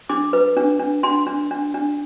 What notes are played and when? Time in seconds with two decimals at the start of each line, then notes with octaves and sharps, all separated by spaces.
0.09 D4 D6
0.33 B4
0.57 D4
0.79 D4
1.03 D4 C6
1.27 D4
1.51 D4
1.74 D4